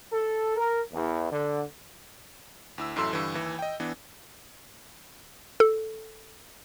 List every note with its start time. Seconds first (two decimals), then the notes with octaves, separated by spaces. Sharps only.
0.12 A4
0.55 A#4
0.92 E2
1.32 D3
2.78 D2 E4 E6
2.96 A1 F#2 E4 A4 C6 E6
3.13 G2 D3 E3
3.34 D#2 E3
3.59 D#5 G5
3.80 E3 B3 D4
5.60 A4